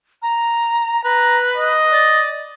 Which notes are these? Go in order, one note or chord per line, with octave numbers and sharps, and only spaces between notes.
A#5
B4 A#5
D#5
D5